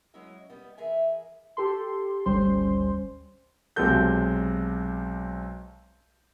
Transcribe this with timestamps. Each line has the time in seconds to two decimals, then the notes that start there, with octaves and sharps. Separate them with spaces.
0.14 F#3 G#3 C#4 E4 D#5 E5
0.50 G3 B3 D#5
0.78 E3 G#4 A#4 E5 G#5
1.57 G4 A4 C6
2.26 G#1 D2 G3 C#4 C5 C6
3.76 B1 C3 G#3 F#4 A4 G6